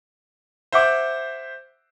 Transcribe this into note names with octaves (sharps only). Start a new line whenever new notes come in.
C5 E5 F#5 D6